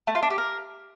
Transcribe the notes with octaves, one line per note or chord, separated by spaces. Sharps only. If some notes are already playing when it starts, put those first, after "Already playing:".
A3
F4
D4
G4
A#4